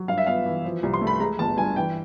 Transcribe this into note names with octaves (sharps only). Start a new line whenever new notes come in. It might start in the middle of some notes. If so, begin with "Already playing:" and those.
Already playing: F#3
G2 F5
E5
B3 F5
E3
F3
C2
C6
A3
B5
G#3 A#5
G1 A5
G2 G#5
E3 G5